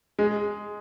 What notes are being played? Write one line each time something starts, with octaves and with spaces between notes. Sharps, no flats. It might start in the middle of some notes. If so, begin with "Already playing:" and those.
G#3